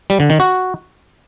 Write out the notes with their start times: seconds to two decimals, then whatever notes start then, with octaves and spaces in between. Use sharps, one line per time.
0.10 G3
0.20 D3
0.30 D#3
0.40 F#4